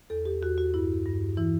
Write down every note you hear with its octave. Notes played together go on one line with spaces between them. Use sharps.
E2 A4
G4
E2 F#4
F#4
G2 E4
G2
E3 E4